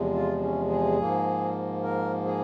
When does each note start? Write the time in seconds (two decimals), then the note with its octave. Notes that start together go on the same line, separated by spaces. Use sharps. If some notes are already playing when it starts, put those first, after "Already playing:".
Already playing: E2 C3 F3 G#3
0.14 F4
0.42 C#4
0.69 G#4
0.98 G#2 F3 A#3
1.83 A#4
2.26 G#4